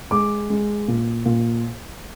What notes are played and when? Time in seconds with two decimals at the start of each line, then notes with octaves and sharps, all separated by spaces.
0.11 G#3 D6
0.50 G#3
0.88 A#2
1.26 A#2